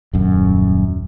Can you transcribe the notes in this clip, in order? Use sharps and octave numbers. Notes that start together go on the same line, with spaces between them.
D#1 F#2